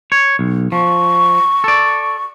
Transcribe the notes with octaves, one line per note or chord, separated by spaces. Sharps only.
C#5
B1
F3 C#6
A4 D5